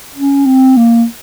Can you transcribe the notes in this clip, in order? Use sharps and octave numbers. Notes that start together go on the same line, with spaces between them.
C#4
C4
A#3